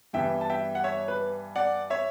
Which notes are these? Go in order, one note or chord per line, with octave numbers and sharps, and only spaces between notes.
G2 E3 G3 B3 E5 G5
A5
E5 G5
F#5
C#5 E5
B4
D5 F#5
C#5 E5